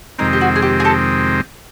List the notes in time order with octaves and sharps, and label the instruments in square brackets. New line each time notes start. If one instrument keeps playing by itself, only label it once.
[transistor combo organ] F2 C3 D#3 G#3 C4 [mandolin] D#4
[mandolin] G4
F#4
G#4
G4
G#4
G4 A4